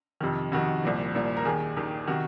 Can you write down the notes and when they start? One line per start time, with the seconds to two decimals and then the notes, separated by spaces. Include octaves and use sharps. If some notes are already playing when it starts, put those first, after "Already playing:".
0.21 F2 C3 D#3
0.52 F2 C3 D#3 F#4
0.84 C2 A#2 F3
1.15 C2 A#2 F3
1.37 A#4
1.45 D#2 D#3 G#4
1.77 D#2 D#3
2.07 C3 D#3 F#4